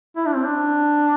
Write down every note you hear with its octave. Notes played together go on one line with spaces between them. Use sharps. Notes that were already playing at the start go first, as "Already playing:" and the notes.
E4
D4
C4
D4